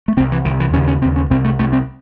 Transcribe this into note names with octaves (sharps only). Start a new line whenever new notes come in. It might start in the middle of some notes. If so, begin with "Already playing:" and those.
A3
C2 C3 C4
E3
C2 C3 D#3
E3
D#2 C#3 C#4
C#4
D#2 C#3 C4
C#4
C2 C3 C4
A3
C2 C3 A3
C4